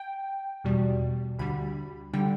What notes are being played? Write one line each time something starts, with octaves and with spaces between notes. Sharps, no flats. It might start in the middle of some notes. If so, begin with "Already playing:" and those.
Already playing: G5
E2 B2 G3
D2 D3 G3 B5
D3 G3 G5